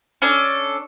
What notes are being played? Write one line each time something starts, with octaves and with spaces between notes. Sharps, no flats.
C#4 D4 A4